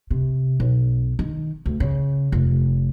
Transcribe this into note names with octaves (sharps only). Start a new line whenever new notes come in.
C3
B1
D#3
D2
C#3
F1